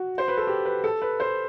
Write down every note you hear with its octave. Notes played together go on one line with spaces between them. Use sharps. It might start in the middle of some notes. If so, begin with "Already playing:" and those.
Already playing: F#4
C5
B4
A4
G4
B4
A4
B4
C5